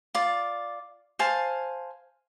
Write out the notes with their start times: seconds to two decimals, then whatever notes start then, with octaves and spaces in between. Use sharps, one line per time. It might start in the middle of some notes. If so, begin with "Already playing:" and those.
0.15 F4 D5
1.19 C5 F5 G#5 A5